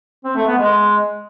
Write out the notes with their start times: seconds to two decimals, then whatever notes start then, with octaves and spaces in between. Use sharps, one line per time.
0.24 C4
0.36 A3
0.47 B3
0.58 G#3